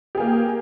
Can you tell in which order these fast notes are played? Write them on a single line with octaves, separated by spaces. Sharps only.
G4 G#4 A#3